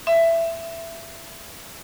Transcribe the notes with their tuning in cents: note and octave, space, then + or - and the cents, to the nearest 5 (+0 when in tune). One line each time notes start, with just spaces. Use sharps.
E5 +15